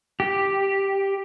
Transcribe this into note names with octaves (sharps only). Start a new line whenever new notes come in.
G4